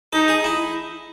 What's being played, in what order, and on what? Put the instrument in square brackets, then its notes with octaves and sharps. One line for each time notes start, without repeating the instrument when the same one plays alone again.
[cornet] D#4 [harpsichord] A4
[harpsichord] G#4
E4